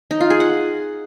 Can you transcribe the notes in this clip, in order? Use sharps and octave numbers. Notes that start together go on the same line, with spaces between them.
D#4
F4
G#4
F#5